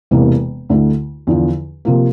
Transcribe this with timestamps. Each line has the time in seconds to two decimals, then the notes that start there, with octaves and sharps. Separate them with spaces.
0.11 E1 E2 C3 E3 A#3
0.69 D2 D3 A3 E4
1.27 E2 D3 F3
1.85 C3 F3 A#3